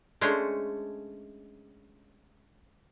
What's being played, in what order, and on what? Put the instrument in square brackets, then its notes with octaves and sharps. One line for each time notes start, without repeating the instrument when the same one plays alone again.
[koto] G#3 A3 C#4 D4 C5 C#5